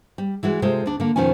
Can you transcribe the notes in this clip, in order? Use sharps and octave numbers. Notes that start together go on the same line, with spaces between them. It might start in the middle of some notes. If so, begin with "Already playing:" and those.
G3
E3 G#3 F#4
C3 G#3 F4 A4 C5
D2 D4
D3 A#3
F2 B2 D#3 F3 C#4 G#5